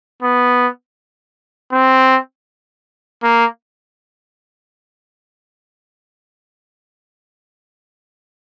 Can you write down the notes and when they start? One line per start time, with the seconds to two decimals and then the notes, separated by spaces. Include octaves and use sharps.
0.23 B3
1.73 C4
3.23 A#3